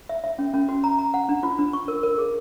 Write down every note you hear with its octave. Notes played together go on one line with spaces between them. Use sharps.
E5
E5
C#4
C#4
F#4
A#5
A#5
F#5
D4
F4
D4
C#6
A#4
A#4
G#4